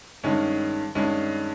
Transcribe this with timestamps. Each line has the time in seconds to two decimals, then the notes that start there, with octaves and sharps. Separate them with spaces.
0.24 G2 D#3 G#3 C#4
0.95 G2 D#3 G#3 C#4